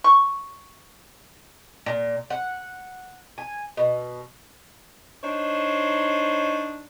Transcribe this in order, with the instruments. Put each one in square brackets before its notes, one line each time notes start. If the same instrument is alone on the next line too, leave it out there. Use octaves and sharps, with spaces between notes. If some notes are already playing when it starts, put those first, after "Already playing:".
[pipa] C#6
[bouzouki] A#2
F#5
G#5
B2
[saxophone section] D4 D#4 C5 C#5